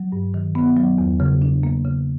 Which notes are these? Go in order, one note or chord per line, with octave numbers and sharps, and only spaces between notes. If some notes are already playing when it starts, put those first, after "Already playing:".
Already playing: F#3
G2
D#3
B3
F#3
E2
C#3
D4
A#3
C#3